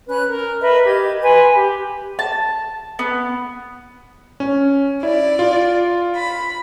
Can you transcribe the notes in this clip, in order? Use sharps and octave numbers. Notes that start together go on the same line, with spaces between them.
C#4 B4 F#6
A#4
A#4 B4 D#5 E5
G4 D#5 G#6
B4 G#5 C6
G4
A5
B3
C#4
E4 D5
F4
B5